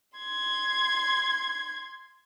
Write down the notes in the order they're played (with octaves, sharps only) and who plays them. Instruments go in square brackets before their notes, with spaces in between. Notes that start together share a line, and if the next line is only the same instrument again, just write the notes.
[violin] C6 G#6